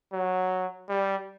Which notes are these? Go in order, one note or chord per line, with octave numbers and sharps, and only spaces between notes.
F#3
G3